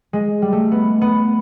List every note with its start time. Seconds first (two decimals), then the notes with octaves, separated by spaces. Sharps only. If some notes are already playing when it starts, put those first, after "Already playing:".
0.13 G#3
0.42 G3
0.53 A3
0.72 B3
1.01 B3